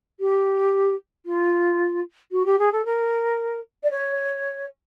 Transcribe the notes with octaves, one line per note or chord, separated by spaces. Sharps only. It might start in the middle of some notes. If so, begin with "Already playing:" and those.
G4
F4
F#4
G4
G#4
A4
A#4
D5
C#5